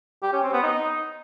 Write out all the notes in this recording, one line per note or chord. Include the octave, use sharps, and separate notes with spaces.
G4
C#4
C4
B3
D#4